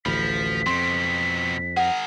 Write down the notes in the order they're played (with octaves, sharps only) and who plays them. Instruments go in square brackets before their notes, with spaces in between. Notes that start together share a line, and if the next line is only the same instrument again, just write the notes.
[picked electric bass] A1 D2 [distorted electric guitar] F3 [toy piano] B5 [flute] B6
[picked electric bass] F2 [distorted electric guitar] B2 C4 [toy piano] C6
[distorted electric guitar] G#4 A#4 [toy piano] F#5